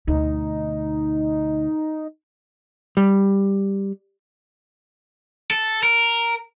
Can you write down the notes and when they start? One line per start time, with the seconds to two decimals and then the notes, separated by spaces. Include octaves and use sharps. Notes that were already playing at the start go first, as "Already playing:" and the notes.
0.07 D2 B2 D#4
2.97 G3
5.51 A4
5.83 A#4